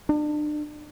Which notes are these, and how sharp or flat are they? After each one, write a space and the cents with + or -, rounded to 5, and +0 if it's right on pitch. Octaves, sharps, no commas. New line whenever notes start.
D4 +35